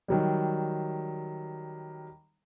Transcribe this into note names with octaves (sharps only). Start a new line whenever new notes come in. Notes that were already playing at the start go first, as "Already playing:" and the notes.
D#3 F#3 G3